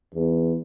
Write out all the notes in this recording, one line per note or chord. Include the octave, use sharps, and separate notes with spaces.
E2